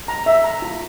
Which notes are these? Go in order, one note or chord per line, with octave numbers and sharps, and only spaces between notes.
A#5
E5
A#5
F4